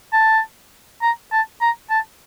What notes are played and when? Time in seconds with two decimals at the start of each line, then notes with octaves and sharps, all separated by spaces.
0.13 A5
1.02 A#5
1.32 A5
1.61 A#5
1.90 A5